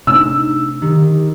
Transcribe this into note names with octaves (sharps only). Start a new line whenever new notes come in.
C3 A3 D4 D#4 E6
D#3 G4